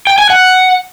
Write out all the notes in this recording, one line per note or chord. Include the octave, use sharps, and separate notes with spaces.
G5
G#5
F#5